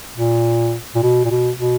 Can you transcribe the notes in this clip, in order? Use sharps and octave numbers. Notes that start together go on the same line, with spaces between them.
A#2
A#2
B2
A#2
B2
B2